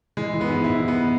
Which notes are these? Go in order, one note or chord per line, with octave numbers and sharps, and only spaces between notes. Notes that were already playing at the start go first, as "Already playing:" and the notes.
E3 G#3
E3
B3
G#2
G#2 E4
E3
B3